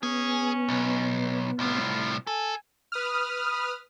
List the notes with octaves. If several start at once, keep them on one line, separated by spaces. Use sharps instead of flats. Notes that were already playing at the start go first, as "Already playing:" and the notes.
B3 C#4 G#4
B1
C2 A2 F4
A4 G#5
B4 D#6 F6